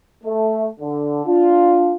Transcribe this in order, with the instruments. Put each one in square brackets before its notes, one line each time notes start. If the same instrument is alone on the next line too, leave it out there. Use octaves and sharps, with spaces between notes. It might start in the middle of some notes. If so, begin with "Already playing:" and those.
[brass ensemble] A3
D3
D4 F4